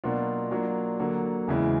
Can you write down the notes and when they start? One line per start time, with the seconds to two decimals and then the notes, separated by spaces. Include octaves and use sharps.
0.04 B2 F#3 A#3 D4 F4
0.51 F#3 A#3 D4 F4
1.00 D3 F#3 A#3 D4
1.48 E2 C#3 E3 G#3